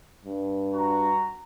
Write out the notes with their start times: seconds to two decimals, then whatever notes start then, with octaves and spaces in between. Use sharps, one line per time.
0.25 G2
0.74 F#4 A#5